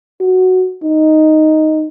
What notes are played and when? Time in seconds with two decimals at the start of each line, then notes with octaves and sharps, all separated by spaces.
0.20 F#4
0.83 D#4